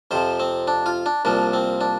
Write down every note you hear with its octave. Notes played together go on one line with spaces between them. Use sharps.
F2 C3 F3 C5
C4
D4
F4
D4
C2 A#2 F3 D4
C4
D4